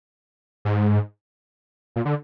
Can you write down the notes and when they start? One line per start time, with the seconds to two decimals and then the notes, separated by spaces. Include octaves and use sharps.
0.65 G#2
1.96 A#2
2.05 D3